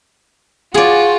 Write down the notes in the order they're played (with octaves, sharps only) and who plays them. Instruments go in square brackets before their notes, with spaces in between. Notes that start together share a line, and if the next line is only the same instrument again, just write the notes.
[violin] F4 F#4 [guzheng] G#4 D5